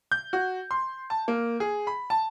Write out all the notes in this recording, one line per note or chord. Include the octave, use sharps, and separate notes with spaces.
G6
F#4
C6
A5
A#3
G#4
B5
A5